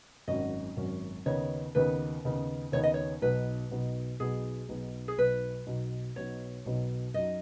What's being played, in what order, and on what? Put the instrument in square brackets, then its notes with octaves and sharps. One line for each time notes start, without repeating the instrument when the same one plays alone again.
[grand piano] G#1 F#2 F#3 C#4 [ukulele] D#5
[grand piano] G#1 F#2 F#3 C#4
[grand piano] D#2 C#3 B3 D#4 [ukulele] C#5
[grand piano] D#2 C#3 B3 D#4 [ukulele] B4
[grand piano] D#2 C#3 B3 D#4
[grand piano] D#2 C#3 B3 D#4 [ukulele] C#5
[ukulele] D#5
C#5
[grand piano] B1 B2 B3 D#4 [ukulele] B4
[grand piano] B1 B2 B3 D#4
[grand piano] B1 B2 B3 D#4 [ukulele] G#4
[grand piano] B1 B2 B3 D#4
[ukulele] G#4
[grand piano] B1 B2 B3 D#4 [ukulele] B4
[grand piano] B1 B2 B3 D#4
[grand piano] B1 B2 B3 D#4 [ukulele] C#5
[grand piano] B1 B2 B3 D#4
[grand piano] F#2 F#3 D#4 [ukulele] D#5